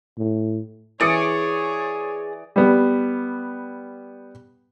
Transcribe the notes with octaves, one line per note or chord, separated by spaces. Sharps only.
A2
E3 G#4 C#5 D5 D#6 C#7
G3 B3